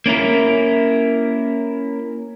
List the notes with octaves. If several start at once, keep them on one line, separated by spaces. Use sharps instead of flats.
A#3 C#4 E4 A#4